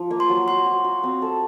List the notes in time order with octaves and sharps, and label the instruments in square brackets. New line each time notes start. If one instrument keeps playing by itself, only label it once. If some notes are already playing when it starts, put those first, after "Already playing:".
Already playing: [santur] F3
A#3
[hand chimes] C6
[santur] F#3
[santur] F#4 [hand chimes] C6
[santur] F#4
F#4
C4
A4